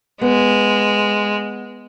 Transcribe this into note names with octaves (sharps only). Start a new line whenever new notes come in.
G#3 B3